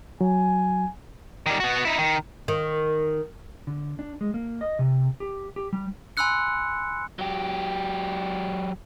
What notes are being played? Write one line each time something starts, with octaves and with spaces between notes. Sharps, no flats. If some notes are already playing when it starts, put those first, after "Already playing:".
F#3 G#5
D#3 G3
B3 F#4
D#4 E4
D#3
D#3
D3
D4
G#3
A#3
D#5
C3
G4
G4
G3
G#5 B5 C6 E6 F#6 C#7
F#3 G4